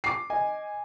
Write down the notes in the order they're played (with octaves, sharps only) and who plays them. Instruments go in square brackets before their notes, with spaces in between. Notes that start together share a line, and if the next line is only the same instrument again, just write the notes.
[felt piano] D6 C7
[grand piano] D#5 [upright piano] G#5